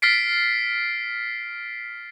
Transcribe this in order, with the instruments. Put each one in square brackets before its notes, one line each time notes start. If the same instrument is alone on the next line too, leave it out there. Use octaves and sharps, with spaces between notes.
[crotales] F6 A6 B6 C7 D7